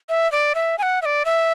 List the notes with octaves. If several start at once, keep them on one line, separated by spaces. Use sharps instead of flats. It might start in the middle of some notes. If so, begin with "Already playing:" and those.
E5
D5
E5
G#5
F#5
E5
D5
E5